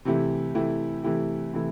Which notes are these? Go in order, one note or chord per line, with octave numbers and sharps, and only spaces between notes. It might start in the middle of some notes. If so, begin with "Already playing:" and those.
C3 E3 A3 E4 G4
C3 E3 A3 E4 G4
C3 E3 A3 E4 G4
C3 E3 A3 E4